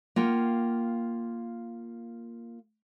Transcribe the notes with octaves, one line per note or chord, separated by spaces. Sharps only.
A#3 F4 F#5 G5